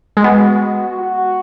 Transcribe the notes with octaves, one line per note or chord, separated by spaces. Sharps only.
G#3
B3 F#4
F#4